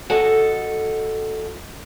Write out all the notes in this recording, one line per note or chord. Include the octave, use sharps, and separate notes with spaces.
F#4 A4 D#5